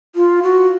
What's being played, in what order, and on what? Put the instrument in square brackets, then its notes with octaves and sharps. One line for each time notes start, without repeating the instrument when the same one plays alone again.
[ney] F4
F#4